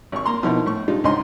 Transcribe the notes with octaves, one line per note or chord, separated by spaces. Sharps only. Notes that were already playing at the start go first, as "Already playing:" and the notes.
G#1 C#6
A#3 A#5 C6
B2 F3 D#4 E4 A#4
A2 C#6
G3 G#3 D4 D#4 F4
C#2 G#2 D3 D#5 C6